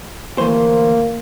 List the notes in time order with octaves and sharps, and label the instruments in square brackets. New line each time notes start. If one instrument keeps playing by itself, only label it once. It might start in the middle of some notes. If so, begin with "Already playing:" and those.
[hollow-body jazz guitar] D2 E3 C5 [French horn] A#3